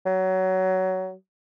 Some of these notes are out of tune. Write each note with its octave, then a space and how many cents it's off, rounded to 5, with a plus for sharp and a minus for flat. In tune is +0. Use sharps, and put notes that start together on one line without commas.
F#3 +20